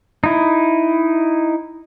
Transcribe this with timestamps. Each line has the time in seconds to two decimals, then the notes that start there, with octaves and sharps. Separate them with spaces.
0.24 D#4 E4